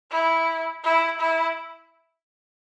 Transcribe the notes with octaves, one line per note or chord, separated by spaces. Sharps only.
E4
E4
E4